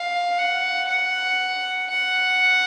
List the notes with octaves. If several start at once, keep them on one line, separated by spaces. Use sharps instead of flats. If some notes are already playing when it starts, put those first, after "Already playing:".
Already playing: F5
F#5
F#5
F#5